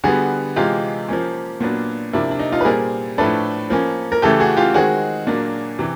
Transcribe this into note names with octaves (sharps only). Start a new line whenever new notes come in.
D3 G3 B3 F#4 G#4
C3 E3 G#3 F4 G4
F3 A#3 C#4
A#2 F#3 B3 D4
C3 F3 A#3 D4 E4
D4
D#4
D#4 F4
B4
A#2 G3 C4 G#4 A#4
A2 F3 A3 D4 A4 B4
F3 A#3 C#4
A#4
C#3 E3 A3 G4 A4
F#4 G#4
F4 G4
D#3 G#3 C4 F#4 G#4
A#2 F#3 A#3 D4
C3 E3